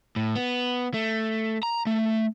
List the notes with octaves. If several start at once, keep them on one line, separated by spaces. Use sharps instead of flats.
A2
B3
A3
A#5
A3